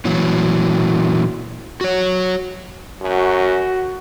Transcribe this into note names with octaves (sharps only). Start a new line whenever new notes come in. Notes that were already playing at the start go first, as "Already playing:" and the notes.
A#2 E3 F#3
F#4 C#5
F#2 F#4